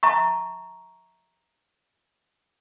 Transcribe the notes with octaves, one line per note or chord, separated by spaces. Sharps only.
E5 A5 A#5 C#6